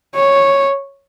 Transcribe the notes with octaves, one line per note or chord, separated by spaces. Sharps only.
C#5